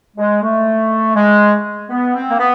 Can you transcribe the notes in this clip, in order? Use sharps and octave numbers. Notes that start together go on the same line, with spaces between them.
G#3
A3
G#3
B3
C4
A#3
B3